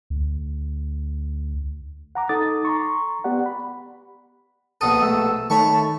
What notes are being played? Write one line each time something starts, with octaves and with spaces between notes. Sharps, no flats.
D2
F#5 A#5 D6
D#4 A4 D6 D#6 A6
A#5 C6 C#6
B3 G4 D5 F#5
B5
A#1 B2 A4 D#6 D#7
A3 E6
D#3 A3 C#5 A5 B5 C#6